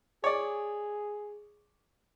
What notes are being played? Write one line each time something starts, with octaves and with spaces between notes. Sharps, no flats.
G#4 C#5 D5